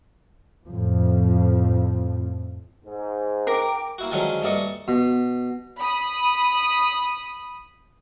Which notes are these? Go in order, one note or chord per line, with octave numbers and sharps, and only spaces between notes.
F2 A2 F3
G#2
A#4 G5 D6
A#3 E4 F#4
D3 D#3 F3 F#3 G#3 C#4
G2 A3 A#3 D5 D#5 C#6
B2
B5 D#6